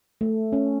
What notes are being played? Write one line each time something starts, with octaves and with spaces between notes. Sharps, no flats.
A3
C#4